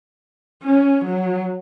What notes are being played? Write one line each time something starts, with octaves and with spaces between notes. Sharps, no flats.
C#4
F#3